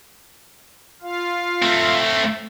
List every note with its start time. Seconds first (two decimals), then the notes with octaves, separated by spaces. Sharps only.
1.02 F4 F5
1.63 A3 C4